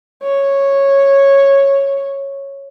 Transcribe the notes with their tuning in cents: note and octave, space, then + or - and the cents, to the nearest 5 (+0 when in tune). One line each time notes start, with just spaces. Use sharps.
C#5 -10